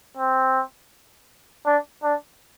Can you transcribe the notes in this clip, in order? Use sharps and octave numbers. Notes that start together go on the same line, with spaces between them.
C4
D4
D4